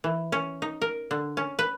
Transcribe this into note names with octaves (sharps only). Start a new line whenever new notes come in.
E3
C#4
D#4
A#4
D3
C#4
B4